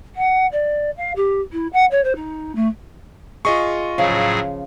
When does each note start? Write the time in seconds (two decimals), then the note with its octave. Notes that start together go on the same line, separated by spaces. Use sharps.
0.16 F#5
0.52 D5
0.97 F5
1.16 G4
1.52 E4
1.73 F#5
1.91 C#5
2.04 C5
2.16 D#4
2.55 A3
3.45 F4 G#4 D#5 C#6
3.98 A2 C#3 F3 F#3 G#4